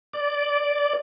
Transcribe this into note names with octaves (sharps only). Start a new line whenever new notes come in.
D5